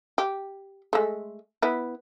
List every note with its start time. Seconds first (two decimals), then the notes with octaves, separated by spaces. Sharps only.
0.18 G4
0.93 G#3 A3
1.62 B3 E4